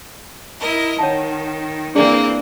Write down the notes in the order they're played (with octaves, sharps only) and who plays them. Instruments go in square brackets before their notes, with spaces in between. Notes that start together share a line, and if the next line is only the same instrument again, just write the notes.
[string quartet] E4 A#4 D#5
[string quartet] D#3 [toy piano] C#5 F#5 A5
[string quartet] E3 A#3 C4 [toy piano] D4 G#4 D5